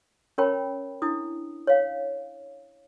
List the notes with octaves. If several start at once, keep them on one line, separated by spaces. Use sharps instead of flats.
C#4 A#4 C#5 G5 A5 B5
D4 E4 D#6
C#5 F5